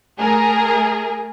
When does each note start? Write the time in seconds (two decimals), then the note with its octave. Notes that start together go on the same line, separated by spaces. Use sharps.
0.19 A3 G#4 A#4